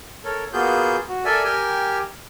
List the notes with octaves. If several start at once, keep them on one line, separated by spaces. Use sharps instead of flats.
A4 A#4 C#5
A#3 B3 F4 F#4 G#4 G6
F#4
A4 A#4 D5 E5 G#5
G4 A#4 G5 G#5